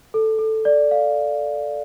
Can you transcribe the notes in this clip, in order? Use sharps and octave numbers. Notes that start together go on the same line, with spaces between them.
A4
A4
D5
F5